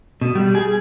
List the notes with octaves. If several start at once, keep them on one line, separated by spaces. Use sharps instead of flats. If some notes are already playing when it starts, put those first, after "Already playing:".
B2
G3
G#4